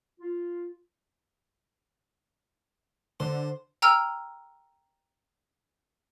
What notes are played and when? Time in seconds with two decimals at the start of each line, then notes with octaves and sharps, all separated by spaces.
0.20 F4
3.20 D3 C5
3.82 G5 A#5 E6 F6